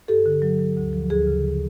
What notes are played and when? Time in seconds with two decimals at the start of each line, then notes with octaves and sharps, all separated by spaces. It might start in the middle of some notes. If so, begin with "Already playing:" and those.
0.08 G2 G4 A4
0.26 D3
0.42 F#3
0.59 F#3
0.77 D2
0.93 F3
1.10 D2 G#4
1.27 C#3